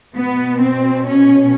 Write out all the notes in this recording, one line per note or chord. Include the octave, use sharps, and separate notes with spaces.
B2 B3
C4
C#4